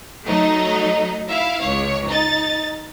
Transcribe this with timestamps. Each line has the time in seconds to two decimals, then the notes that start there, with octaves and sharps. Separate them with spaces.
0.25 F#3 A3 D#4
1.28 E4 E5 F5
1.62 C#2 C#5
2.09 D#4 A6